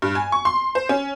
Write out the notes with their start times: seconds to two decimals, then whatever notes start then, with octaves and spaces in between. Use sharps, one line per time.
0.02 G2
0.15 G#5
0.32 C#6
0.45 C6
0.75 C5
0.89 C#4